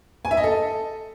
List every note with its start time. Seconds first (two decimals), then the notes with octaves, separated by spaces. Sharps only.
0.25 G#5
0.31 E5
0.37 D#5
0.44 A4